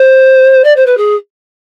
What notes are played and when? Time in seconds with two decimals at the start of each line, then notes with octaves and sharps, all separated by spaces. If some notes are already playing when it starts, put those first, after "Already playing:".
Already playing: C5
0.64 D5
0.76 C5
0.86 B4
0.97 G#4